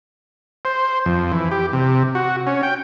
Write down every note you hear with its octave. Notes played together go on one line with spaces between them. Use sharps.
C5
F2
E3
G4
C3
F#4
C#4
G5